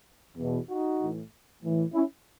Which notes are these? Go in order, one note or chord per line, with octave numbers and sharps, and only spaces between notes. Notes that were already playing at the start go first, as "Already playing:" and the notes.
E2 B2
D#4 F#4
A2 E3
A2 E3
C#4 E4